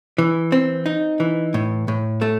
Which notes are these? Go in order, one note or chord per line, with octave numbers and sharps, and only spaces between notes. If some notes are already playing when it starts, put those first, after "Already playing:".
E3
C4
D#4
E3
A2
A2
A3